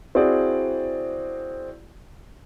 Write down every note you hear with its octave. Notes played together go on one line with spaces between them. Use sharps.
C4 E4 F#4 G#4 D5